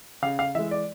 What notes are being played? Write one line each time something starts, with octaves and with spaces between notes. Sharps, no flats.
C#3 F5
F5
E3 G#3 E5
D5